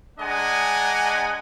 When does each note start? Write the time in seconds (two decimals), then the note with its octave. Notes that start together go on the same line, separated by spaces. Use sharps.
0.19 G#3 D4 D#5 F#5 G#5 A#5